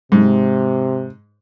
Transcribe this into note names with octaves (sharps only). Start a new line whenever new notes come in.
G#2 C3